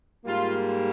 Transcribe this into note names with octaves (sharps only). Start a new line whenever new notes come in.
G#2 G3 A#3 F4